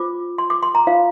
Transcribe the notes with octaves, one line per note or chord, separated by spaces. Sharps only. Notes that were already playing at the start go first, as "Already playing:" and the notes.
Already playing: F4 C5 D6
C6
D6
C6
A#5
F4 C5 F5